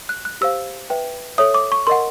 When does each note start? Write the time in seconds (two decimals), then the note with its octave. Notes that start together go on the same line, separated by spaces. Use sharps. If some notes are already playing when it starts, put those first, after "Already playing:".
0.09 F#6
0.25 F#6
0.41 G4 C5 F5 E6
0.90 B4 E5 G5
1.38 A4 C#5 E5 D#6
1.54 D6
1.72 C#6
1.87 A#4 D#5 F#5 C6